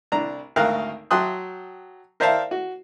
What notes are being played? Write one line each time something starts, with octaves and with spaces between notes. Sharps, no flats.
C2 D4 A#5
G#1 D2 A#4 F5 G5 F#6
F#3 G5 A5 C6 D#6 F#6
A#4 C5 D5 E5 F5 A5
F#4